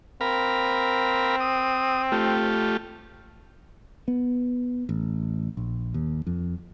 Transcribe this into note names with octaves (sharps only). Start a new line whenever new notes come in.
C4 A#4 F5 B5
D#6
A3 F4 G4
B3
A1
A#1
D#2
F2